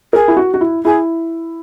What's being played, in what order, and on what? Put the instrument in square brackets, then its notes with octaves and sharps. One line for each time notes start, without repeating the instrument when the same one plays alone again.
[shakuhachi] G#4 [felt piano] A#4
[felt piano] E4
F#4
F#4
E4
[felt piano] E4 [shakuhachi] G#4